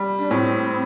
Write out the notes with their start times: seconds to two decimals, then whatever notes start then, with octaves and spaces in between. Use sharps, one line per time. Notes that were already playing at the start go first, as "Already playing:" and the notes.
Already playing: G3
0.19 D4
0.30 A2 C4